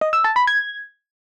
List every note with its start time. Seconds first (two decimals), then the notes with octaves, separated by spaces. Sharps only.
0.01 D#5
0.13 E6
0.24 A5
0.36 B5
0.47 G#6